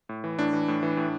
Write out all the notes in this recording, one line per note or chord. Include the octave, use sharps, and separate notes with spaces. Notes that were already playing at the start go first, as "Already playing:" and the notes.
A2
E3
A2 D4
E3
A2
E3
A2